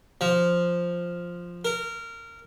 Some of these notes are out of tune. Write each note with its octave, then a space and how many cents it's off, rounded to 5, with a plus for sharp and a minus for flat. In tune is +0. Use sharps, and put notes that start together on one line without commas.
F3 +0
A#4 -20